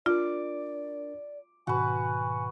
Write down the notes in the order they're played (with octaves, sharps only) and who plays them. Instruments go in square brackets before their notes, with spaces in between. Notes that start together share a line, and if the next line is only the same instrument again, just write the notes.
[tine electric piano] D4 A#4 [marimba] F4 [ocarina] D5 [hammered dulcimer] D6
[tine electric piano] G#2 B2 D#3 [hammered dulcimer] F#4 B4 [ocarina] G#5